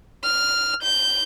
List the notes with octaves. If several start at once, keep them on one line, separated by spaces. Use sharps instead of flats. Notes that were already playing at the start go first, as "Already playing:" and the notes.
F6
G6